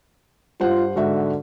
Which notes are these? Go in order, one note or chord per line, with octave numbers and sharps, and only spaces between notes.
G2 F4 C5 F#5
G#2 D3 F#4 E5